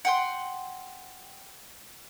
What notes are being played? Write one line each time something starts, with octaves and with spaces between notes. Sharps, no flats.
F#5 G5 C6